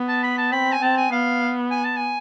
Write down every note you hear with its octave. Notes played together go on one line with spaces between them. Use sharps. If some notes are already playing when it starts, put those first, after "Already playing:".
Already playing: B3
A5
B5
A5
C4 B5
G#5
C4 A5
G#5
B3 F5
G#5
A5
G#5